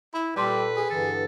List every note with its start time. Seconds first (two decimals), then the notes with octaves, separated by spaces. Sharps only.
0.14 E4 B5
0.36 A#2 G3 A4 B4 G5 C6
0.76 G#4
0.90 G2 D3 E3 A4